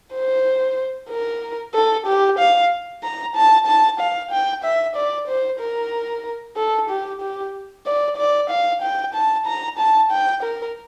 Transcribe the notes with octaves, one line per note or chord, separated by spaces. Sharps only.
C5
A#4
A4
G4
F5
A#5
A5
A5
F5
G5
E5
D5
C5
A#4
A4
G4
G4
D5
D5
F5
G5
A5
A#5
A5
G5
A#4